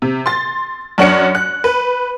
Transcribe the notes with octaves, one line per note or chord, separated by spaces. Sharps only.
C3
C6 A6
F#2 D4 C#5 F#5 C#7
F#6
B4